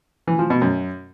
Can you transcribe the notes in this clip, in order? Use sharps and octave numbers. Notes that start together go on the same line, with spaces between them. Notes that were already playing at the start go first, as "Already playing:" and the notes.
E3
F3
B2
F#2